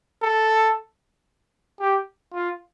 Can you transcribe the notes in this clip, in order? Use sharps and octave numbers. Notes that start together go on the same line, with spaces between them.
A4
G4
F4